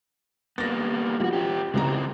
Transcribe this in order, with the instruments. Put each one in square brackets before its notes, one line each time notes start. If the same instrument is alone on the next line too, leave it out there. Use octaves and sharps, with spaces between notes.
[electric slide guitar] G3 A#3 B3 [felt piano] A6 A#6
[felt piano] F3 G3 [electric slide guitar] E4 F#4
[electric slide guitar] C#4 G4
[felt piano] C#2 G3 A#5 [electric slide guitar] G#3 C4 E4